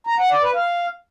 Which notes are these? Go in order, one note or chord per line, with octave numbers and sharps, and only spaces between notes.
A#5
F#5
D5
B4
F5